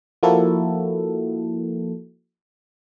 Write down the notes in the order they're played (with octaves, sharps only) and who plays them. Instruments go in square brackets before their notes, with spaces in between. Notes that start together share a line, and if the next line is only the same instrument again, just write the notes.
[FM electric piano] F3 A#3 E4 F#4 A4